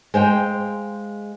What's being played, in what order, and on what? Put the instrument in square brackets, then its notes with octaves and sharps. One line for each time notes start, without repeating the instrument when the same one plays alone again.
[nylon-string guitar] G#3 C5 F5 G5